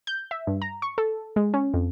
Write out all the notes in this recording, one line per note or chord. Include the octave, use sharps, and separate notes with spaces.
G6
E5
G2
A#5
C#6
A4
G#3
C#4
F2